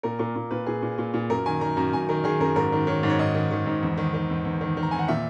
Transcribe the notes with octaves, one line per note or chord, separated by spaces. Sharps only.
A#2 A#4
A#2 A#4
A#2
A#2 B4
A#2 G#4
A#2
A#2
A#2
F#2 A#4
D#3 G#5
D#3 A#5
F#2 A#5
F#2 G#5
D#3 A#4
D#3 G#4
F#2 A#4
G#2 A#4
D#3
D#3 C#5
G#2
C#5
G#2 D#5
D#3
D#3
G#2
E2
D#3
D#3
E2
E2
D#3
D#3
A#5
E2 G#5
F#5
A#2 E5